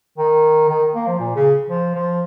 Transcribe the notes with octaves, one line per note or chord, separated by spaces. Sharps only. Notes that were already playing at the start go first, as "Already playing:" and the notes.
D#3
D#3
A#3
F3
A#2
C#3
F3
F3